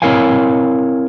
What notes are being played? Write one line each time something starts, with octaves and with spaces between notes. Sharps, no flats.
C4 E4 A#4 C#5 F5 G#5